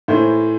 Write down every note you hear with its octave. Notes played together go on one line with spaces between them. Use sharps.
A2 E3 C5